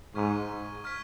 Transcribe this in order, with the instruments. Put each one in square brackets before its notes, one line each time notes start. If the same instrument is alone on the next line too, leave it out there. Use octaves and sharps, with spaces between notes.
[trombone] G#2 [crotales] C#6 F6 G#6 B6 D#7
[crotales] C#6 F6 G#6 B6 D#7